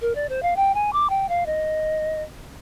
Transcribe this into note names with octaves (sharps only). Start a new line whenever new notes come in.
A#4
D5
C5
F5
G5
G#5
D6
G5
F5
D#5